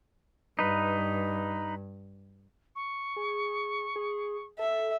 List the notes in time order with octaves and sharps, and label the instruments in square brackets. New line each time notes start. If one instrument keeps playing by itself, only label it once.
[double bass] G2 [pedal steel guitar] D#4 B4
[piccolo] C#6
[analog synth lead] G#4
G#4
[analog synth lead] A4 [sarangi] E5